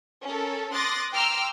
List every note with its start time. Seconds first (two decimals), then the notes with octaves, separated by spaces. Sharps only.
0.23 C#4 A4 A#4
0.73 C6 D6 D#6 F#6 A6 A#6
1.12 G5 A#5 C6 D6 E6 F6